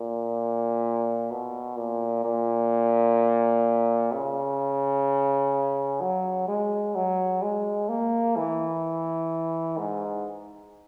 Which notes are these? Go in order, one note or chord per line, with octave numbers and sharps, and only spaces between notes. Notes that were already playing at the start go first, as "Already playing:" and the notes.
Already playing: A#2
B2
A#2
A#2
C#3
F#3
G#3
F#3
G#3
A#3
E3
G#2